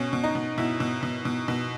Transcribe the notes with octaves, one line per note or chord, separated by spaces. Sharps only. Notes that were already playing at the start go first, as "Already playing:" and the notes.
Already playing: B2 C#4
B2
D#4
B2
B2 E4
B2
B2
B2
B2